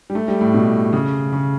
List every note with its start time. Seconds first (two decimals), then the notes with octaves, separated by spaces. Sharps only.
0.10 G3
0.15 A3
0.28 G3
0.41 A2
0.54 B2
0.93 C#3
1.33 C#3